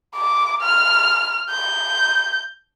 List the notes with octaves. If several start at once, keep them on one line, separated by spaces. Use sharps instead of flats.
D6
F6
G6